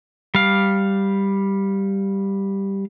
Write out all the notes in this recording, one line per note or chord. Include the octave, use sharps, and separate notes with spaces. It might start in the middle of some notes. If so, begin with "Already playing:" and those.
G3 F5